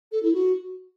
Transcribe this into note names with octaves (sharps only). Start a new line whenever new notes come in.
A4
E4
F#4